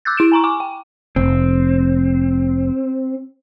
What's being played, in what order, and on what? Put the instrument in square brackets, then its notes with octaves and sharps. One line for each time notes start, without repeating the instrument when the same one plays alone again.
[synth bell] D6 E6 F#6 G6 A6
E4 D7 E7
G#5 A#5 C#6
G#5 C#6 D6
G5
[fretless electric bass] F1 [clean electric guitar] C4